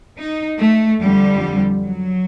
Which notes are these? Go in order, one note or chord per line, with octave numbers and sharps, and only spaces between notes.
D#4
A3
F2 D3 G3
F#3